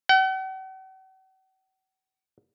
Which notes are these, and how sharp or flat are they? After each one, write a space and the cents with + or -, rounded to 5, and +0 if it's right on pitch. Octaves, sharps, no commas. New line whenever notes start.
F#5 +45